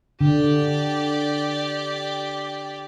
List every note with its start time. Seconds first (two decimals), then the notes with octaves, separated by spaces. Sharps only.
0.21 D3 G4 D5